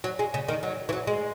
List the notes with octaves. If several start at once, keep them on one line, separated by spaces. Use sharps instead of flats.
F#3
G#3
C#3
D#3
F#3
E3
F#3
G#3